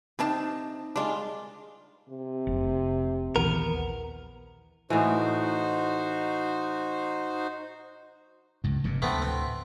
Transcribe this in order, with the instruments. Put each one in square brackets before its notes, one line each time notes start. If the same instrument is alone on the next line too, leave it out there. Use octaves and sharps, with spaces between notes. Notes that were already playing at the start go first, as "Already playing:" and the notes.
[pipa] C3 D4 A5 [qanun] C4 D#4
[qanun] G3 G#3 A#4 [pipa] D4 F4
[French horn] C3
[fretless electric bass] F1
[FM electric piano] A#1 D#2 E3 [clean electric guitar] B3 A#4
[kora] A2 E3 [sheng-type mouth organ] D#4 F#4 C5
[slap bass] C#2 G2
F1 G2 A#2
[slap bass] D2 A2 [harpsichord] A3 B3 C4
[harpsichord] C4